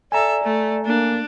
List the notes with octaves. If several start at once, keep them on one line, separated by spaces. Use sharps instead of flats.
A4 D5 E5 G#5 A#5
A3
A#3 D4